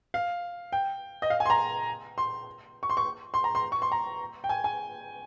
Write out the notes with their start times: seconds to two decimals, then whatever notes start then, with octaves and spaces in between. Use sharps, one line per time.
0.14 F5
0.72 G5
1.22 D#5
1.30 F5
1.40 G#5
1.46 C6
1.50 A#5
2.18 C6
2.83 C#6
2.90 C6
2.97 C#6
3.34 C6
3.44 A#5
3.55 C6
3.72 C#6
3.82 C6
3.92 A#5
4.44 G5
4.49 G#5
4.64 G#5